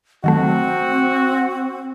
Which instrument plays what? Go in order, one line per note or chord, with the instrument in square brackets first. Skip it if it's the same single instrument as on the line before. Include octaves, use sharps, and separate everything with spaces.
[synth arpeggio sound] D#3 F#3 A3 [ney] C4 [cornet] F#4